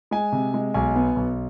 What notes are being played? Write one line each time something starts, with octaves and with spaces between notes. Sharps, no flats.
G#3 G#5
C3
G#3
B1 G#5
B3
B1